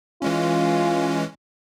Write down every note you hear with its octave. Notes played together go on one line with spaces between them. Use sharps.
E3 G#3 C#4 F4